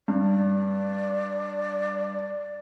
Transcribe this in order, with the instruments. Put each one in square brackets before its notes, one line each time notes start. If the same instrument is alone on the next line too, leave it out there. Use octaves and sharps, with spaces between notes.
[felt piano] G2 [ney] D5